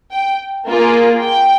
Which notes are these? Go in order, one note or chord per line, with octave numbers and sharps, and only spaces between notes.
G5
A#3 F4 G#4
G5